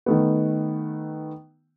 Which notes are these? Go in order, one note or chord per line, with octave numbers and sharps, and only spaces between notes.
D#3 A3 B3